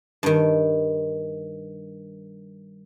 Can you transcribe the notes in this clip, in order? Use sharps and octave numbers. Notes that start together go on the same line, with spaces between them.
G2 D#3